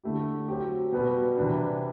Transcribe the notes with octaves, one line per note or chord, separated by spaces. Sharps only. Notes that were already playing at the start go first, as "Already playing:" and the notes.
D3 A3 E4 G4
F#3 C4 G4
B2 G3 B3 F#4
C3 E3 G3 D4